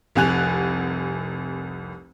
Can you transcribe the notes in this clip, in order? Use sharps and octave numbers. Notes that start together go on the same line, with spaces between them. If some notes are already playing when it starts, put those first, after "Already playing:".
F1 C2 G#5 F#6 F7